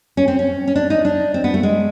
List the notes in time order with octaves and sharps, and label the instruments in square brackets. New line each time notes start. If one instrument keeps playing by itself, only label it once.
[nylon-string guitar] C#4
C4
C#4
C#4
D4
D#4
D4
C4
B3
A3
G#3